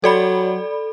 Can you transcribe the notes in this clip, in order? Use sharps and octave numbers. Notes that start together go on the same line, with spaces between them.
F#3 A4 D5 B5